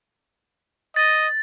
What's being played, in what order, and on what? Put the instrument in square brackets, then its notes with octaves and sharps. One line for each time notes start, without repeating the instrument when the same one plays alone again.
[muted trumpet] D#5 [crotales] A6